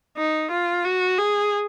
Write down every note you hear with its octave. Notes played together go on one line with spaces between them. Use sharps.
D#4
F4
F#4
G#4